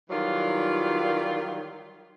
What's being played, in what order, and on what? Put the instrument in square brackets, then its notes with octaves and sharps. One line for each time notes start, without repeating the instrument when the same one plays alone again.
[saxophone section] D#3 E3 F#3 G3 F4 D5